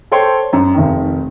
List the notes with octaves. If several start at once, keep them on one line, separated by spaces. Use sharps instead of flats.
A4 C5 C#5 G5 C6
F#2
F1 D#3